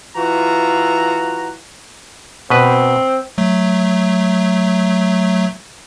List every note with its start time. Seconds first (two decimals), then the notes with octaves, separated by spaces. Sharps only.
0.16 E3 F4 F#4 A#5
2.50 B2 C4 B4
3.38 F#3 A3